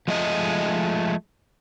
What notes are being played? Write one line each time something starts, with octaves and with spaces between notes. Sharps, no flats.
F3 G#3 A3 D#5